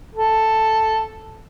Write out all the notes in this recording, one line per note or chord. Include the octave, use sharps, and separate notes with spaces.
A4